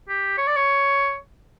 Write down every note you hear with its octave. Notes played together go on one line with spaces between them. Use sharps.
G4
C#5
D5
C#5